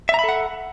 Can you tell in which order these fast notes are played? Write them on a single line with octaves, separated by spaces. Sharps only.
E5 A#5 B5 A4 F#5